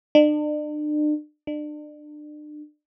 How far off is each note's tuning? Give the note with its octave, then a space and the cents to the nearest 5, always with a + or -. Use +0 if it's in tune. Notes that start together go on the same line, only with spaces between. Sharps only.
D4 +40
D4 +35